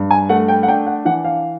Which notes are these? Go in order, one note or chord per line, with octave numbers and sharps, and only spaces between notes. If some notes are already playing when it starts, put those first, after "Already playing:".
Already playing: G2
G#5
A3 F#5
G5
F#5
D4 G5
F#5
E3 F#5
F5